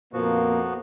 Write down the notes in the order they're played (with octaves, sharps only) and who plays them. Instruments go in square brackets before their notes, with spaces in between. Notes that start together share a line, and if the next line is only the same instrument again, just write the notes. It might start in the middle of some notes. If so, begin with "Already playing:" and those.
[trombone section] F2 A#2 A#3 [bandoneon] F3 B3 F#4